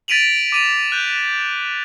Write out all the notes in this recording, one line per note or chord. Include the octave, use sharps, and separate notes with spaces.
A6 B6 D7 D#7 F7 F#7
D6 D#7 F7
F#6 G6